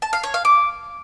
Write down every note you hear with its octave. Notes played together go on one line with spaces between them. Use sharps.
A5
F5
C#5
F5
D6